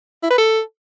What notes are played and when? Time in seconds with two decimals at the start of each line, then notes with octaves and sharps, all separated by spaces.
0.23 E4
0.30 B4
0.38 A4